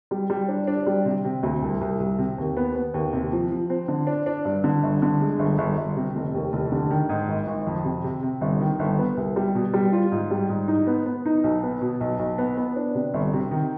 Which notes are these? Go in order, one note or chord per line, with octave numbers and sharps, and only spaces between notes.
G3
G3
D4
D4
G3
C3
C3
D2
C2
C2
C2
C3
D#2
B3
B3
D#2
C3
F3
F3
C4
D3
D4
D4
G2
D3
G1
D3
G#3
G1
G1
G1
C3
F1
D#2
F1
D3
D#3
G#2
G#1
G#1
F2
C3
C3
C3
G1
D#3
G1
B3
C2
G3
B2
G3
F4
G#2
G3
G#2
D#4
B3
B3
D#4
B1
B3
B2
B1
B1
B3
B3
D4
C3
G1
C3
D#3